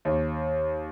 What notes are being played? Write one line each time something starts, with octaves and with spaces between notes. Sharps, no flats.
D#2